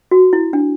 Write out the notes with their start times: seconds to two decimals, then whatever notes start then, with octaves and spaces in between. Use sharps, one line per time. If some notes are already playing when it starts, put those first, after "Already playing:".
0.11 F#4
0.33 E4
0.53 D4